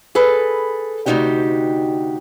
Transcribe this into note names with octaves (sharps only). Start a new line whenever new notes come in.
G#4 A4 B4
D2 C3 F#3 D#4 F#4 G4